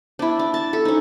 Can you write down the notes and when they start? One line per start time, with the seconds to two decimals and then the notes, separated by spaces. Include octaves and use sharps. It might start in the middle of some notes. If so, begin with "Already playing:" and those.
0.19 D4 E4
0.39 D4
0.54 A5
0.73 A4
0.85 C#4 D#4